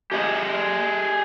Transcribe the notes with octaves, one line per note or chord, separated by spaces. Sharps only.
G4 G#4 D#5